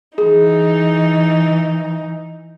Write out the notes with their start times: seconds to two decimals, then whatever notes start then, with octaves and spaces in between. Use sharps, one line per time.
0.18 E3 D#4 G#4